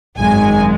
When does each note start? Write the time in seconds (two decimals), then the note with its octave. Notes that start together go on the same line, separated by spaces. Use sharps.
0.18 G#1 F#2 D#3 G#3 G#5